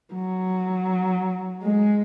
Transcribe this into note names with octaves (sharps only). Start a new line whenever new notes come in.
F#3
G#3